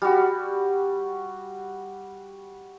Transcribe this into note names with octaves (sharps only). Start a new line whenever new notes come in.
G3 F#4